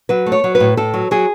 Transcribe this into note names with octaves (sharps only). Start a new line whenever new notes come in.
F#3 B4
A3
C#5
F#3
B4
A2
A2 A4
F#3
F#3 G#4